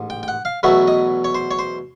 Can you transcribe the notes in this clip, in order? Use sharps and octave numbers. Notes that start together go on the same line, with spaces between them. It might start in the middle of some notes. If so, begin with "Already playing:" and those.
Already playing: A1 G#2
G5
G5
F#5
F5
E2 B2 F#3 A3 E5
D#5
C#5
C5
C#5
C5